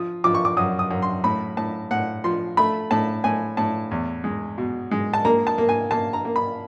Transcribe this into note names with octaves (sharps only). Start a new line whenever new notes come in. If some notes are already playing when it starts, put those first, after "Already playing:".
Already playing: F3 D#6
F3 D6
C#6
D6
F#2 D#6
D#6
F#2
C6
A2 B5
A2 A5
A2 F#5
F3 C6
A3 B5
A2 A5
A2 G#5
A2 A5
E2
G#3
B2
G#3
A5
A#3 A#5
A5
A#3
G#5
A#3 A5
A#5
A#3
B5